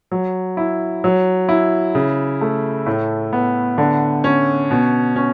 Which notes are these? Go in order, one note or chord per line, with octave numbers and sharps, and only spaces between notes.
F#3
E4
F#3
E4
C#3
A3
A2
B3
D3
C#4
B2
C#4